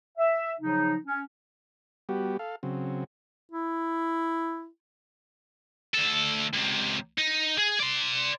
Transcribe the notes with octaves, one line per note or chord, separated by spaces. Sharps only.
E5
C#3 F3 F#3 D#4
C#4
G3 B3 F#4 G4
A4 F5
C#3 F#3 C4
E4
D2 A4
C#2 C3
D#4
G#4
D5 C6